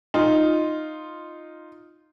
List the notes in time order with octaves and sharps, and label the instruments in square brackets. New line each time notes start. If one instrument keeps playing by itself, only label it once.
[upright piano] D#4 F4